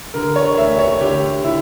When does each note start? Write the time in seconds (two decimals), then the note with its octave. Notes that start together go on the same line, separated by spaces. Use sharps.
0.14 D3 A#4
0.36 C#5
0.58 D2 E5
0.79 C#5
1.01 D3 G4
1.44 D3 E4